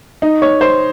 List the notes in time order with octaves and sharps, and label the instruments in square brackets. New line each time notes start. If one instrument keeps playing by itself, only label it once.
[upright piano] D#4
C#5
C5